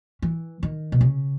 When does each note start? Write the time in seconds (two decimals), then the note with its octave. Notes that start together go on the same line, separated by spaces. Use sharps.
0.22 E3
0.63 D#3
0.92 B2
1.01 C#3